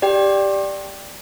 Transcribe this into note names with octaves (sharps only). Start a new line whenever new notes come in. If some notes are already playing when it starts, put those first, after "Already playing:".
G4 D5 G5